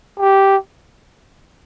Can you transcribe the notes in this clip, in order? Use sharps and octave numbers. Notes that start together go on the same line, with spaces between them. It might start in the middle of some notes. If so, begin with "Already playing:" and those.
G4